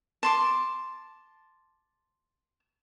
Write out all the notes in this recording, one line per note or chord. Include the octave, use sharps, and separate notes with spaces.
A5 C6 D6